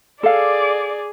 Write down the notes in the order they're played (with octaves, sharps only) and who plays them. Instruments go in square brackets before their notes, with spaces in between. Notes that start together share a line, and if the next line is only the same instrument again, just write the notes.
[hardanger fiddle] G#4 [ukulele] A4 F5 [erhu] D5